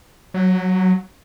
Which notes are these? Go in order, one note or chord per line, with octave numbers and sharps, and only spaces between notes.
F#3